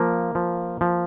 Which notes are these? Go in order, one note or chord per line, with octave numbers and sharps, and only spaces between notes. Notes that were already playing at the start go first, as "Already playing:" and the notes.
Already playing: F3 A#3
F3
F3